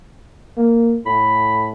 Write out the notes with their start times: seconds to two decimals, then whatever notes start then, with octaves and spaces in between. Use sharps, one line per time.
0.57 A#3
1.06 A2 B5